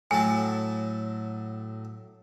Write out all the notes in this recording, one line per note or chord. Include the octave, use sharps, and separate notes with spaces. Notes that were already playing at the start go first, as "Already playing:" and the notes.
A2 F#3 G#5 A5